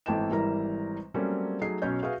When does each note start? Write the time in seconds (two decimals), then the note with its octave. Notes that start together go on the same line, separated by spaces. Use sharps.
0.06 G#1 E3 A3 G5 A5 E7
0.30 G#1 E3 G3 E4 A#4 A#5
1.14 F#3 G3 A3 A#3 C4 C#4
1.61 F#3 A3 D#4 G#4 C7
1.82 B1 B2 C#4 C#5 G6
2.03 F#4 G#4 B4 E5 F5